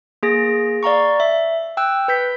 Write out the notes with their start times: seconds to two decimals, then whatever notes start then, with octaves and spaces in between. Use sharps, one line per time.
0.23 A#3 G#4 A#6
0.83 D5 F5 A#5 C#6
1.20 E5
1.77 G5 E6 F#6
2.08 B4 G6 B6